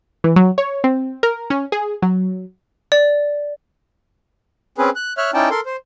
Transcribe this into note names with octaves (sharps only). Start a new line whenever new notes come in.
E3
F#3
C#5
C4
A#4
C#4
G#4
F#3
D5
C4 C#4 G#4 B4
F#6
C#5 E5 F6 F#6
C#4 D#4 E4 D5 G5 A5
A4 A#4 C6
C5